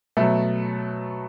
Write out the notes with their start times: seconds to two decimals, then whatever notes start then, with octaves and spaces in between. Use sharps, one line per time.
0.17 B2 F#3 A3